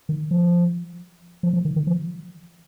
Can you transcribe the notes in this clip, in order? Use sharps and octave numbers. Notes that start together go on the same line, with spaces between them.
D#3
F3
F3
F3
D#3
D#3
F3